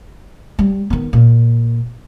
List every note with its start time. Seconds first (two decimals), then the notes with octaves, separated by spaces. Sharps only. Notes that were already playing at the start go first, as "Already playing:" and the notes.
0.59 G3
0.90 D#3 B3
1.13 A#2